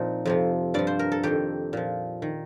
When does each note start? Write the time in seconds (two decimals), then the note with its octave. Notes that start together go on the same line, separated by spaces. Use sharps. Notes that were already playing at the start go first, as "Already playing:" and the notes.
Already playing: A#2 F3 C4 D#4
0.25 F2 C3 F3
0.74 G2 F3 D5
0.87 C5
0.99 A#4
1.12 A4
1.23 F2 D#3 G4
1.73 A#2 F3
2.22 D#3